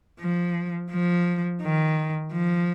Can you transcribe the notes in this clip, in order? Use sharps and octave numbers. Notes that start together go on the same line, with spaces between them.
F3
F3
D#3
F3